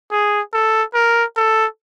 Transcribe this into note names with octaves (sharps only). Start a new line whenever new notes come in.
G#4
A4
A#4
A4